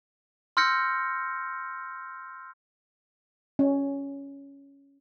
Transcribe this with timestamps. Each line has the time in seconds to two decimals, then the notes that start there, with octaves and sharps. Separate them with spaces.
0.57 C6 E6 F6 G6 A#6 C#7
3.59 C#4